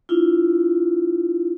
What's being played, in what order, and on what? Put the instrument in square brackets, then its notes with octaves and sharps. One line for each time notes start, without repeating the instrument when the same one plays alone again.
[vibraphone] D4 E4 F4